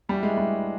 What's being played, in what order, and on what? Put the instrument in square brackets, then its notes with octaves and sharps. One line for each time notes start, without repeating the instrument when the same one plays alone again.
[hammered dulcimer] E3 A3 D4 F#4 [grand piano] G3
[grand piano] G#3
G3